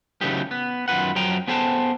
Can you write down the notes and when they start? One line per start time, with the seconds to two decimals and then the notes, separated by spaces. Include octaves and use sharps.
0.21 C#3 E3 F#3 A3 D#4 G4
0.51 B3
0.88 F#2 D#3 F4 B4 F#5
1.15 F#2 F3 F#3 G5 A#5
1.48 B3 G#4 A4 C5 G5 A5